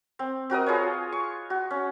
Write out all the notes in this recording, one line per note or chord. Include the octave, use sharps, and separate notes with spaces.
C4
C4 F#4 A#4 D#5
F4 G#4 B4 C#5
C#6
F#4
C#4